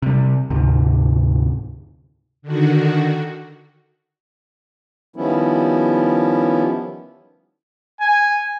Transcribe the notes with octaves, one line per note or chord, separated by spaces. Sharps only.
C3 G3
D2 G#2 C3
D3 D#3 F#4
D#3 F3 G3 B3 C#4 E4
G#5